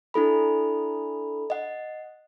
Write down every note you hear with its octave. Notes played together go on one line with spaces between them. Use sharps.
D4 E4 A4 B5
D#5 F#5